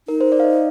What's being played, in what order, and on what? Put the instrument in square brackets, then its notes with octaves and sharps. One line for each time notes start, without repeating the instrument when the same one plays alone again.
[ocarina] D#4 [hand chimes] A#4
[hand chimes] C5
D5
F5
D#5